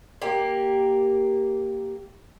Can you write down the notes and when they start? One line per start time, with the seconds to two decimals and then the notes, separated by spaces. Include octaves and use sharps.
0.22 A#3 G4